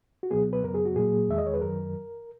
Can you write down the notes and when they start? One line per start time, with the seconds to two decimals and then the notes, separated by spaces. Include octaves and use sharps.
0.23 F#4
0.31 C#2 B2 F#3 B3 G#4
0.53 B4
0.63 F#2 C#3 F#3 B3 A#4
0.74 G#4
0.85 F#4
0.96 A#2 F#3 A#3 G#4
1.28 E2 D#3 G#3 E5
1.38 D#5
1.46 C#5
1.54 B4
1.61 F#2 D#3 F#3 A#4